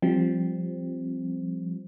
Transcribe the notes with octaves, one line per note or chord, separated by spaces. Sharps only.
F3 G3 C4